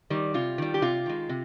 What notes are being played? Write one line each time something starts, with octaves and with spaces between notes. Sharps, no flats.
D#3 G3
C3 F4
D#3 G3
G4
C3 F4
D#3 G#3
C3